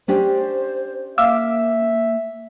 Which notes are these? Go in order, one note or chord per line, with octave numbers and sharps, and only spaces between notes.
C#4 D4 G4 C5
A#3 E5 F5 D6 E6